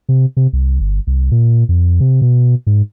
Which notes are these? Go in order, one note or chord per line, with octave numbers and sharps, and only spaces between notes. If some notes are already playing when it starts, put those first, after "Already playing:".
C3
C3
C2
G1
C2
A#2
F2
C3
B2
G#2